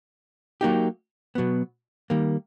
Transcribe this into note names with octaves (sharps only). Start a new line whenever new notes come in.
F#3 A#3 D#4 G4
B2 F#3 B3
D#3 G3 A#3